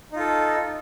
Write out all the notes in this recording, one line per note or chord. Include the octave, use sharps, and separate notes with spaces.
D#4 F4 A4